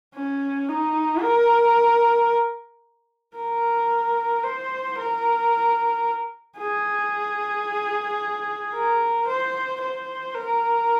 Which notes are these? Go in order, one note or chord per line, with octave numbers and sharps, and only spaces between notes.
C#4
D#4
A#4
A#4
C5
A#4
G#4
A#4
C5
C5
A#4